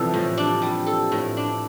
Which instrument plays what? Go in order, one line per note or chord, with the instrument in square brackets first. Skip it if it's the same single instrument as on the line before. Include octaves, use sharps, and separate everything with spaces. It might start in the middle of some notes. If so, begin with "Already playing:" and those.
Already playing: [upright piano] C3 E3 F3 [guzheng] G3 A4
[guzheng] A2 [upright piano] F3
[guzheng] D4
G3
A4
A2
D4